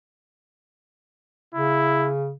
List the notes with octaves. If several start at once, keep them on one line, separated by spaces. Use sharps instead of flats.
C#3 E4